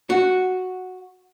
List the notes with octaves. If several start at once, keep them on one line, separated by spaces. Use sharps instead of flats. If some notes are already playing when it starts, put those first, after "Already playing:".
F#4